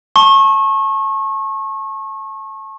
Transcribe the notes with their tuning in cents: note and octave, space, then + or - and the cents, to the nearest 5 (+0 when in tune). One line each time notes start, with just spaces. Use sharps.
A5 +0 C#6 -30